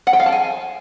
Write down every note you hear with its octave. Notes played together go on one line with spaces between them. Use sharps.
F#5
G5
F5
A5
G#5